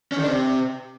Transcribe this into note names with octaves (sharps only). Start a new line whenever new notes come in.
C#4
D#3
D4
C3